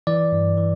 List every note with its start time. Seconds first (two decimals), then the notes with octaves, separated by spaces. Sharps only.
0.07 E3 D5
0.32 G2
0.58 E3